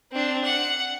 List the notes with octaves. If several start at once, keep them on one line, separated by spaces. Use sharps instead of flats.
C4 D4
F#5